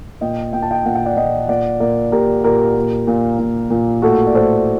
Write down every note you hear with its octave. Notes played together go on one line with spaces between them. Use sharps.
A#2 D#5 G5
A#2 G5
A5
D#5 G5
A#2 F#5
G5
D5 F#5
A#2 D#5 G5
A#2 D5 F#5
A#2 A#4 D5
A#2 G4 A#4
A#2 G4 A#4
A#2
A#2
A#2
A#2
A2 F#4 A4
D5
A2 A4 C5